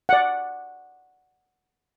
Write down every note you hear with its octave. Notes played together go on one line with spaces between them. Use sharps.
D5 F#5